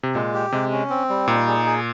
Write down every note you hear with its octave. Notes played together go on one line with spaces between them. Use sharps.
C3
A#2 G#3
G4
C3 G#3
C#4
C4
G3
A#2 D#4
G#4
G#4